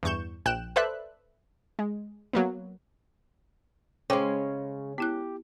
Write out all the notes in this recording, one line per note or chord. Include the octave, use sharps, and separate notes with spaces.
E2 G2 C#6 G6 E7
A#1 G5 F#6 E7
A4 B4 C5 D5 E5 F#6
G#3
F#3 A#3 B3
C#3 G#3 C#4 C5 G5 D6
B3 E4 G4 F#6